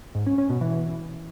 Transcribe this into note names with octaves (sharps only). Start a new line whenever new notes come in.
G#2
C#4
C#4
B2
E3